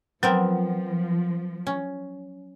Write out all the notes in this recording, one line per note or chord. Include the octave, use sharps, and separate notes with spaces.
F3 F#3 B3 C4 A#4
C#4